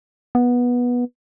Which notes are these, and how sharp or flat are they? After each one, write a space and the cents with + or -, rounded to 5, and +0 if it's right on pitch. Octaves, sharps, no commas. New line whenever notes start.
B3 -15